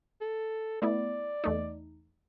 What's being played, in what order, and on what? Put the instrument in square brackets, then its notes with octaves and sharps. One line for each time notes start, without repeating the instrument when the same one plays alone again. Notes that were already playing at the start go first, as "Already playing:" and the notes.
[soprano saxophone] A4
[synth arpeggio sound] A3 B3 E4 [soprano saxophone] D5
[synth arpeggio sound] E2 A3 D#4